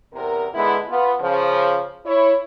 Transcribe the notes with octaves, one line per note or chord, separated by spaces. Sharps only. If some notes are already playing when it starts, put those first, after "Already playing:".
E2 C3 A#4
D3 G#3 B3 E4
B3 F4
C#3 F3 C5
E4 C#5